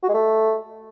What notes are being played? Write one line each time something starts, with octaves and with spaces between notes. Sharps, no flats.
F#4
G#3
A3